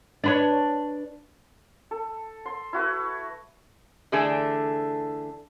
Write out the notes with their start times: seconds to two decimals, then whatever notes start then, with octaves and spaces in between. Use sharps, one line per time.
0.24 D4 B4 C#5
1.91 A4
2.46 C6
2.73 E4 F#4 B4 C#6
4.12 D3 E3 A3 D4 G#4 A4